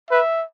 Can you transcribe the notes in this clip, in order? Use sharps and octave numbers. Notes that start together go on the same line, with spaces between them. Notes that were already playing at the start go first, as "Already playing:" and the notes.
B4 E5